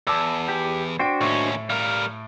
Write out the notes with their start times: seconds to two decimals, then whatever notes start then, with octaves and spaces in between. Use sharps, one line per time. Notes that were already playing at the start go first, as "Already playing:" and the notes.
0.07 E2 A5 D6 E6
0.48 G4
0.99 D4 F#4 C5 G5 D7
1.21 D#2 A2 C#4 C#6
1.70 G3 A#4 F5